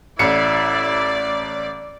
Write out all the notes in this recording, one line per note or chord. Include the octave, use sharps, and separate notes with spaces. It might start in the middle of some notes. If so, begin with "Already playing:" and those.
A1 E4 D5 C#7